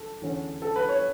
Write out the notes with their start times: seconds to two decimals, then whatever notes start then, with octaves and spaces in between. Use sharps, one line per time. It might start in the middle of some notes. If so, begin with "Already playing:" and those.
Already playing: A4
0.22 E2 D3 A3 C#4
0.62 A4
0.76 B4
0.88 C#5